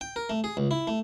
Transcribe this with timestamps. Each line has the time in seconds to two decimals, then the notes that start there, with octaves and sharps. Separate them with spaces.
0.01 G5
0.16 A#4
0.30 A3
0.44 G#4
0.57 C#2
0.71 E4
0.87 A3